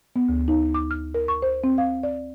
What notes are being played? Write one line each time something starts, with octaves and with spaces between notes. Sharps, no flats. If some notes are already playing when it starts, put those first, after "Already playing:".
B3
D2
D#4
D6
F6
A#4
C#6
C5
C4
F5
D5